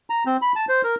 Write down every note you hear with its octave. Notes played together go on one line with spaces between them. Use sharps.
A#5
C4
B5
A5
C5
A#4